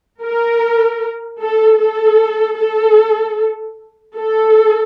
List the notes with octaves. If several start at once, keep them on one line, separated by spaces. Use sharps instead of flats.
A#4
A4
A4
A4
A4